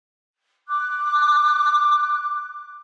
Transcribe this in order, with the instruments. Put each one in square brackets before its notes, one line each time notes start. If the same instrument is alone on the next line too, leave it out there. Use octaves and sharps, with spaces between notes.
[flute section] D6 F#6